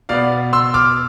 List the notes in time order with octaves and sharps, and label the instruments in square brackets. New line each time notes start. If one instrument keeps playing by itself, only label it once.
[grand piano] B2 B3 D5 F5
C6 E6
D6 F6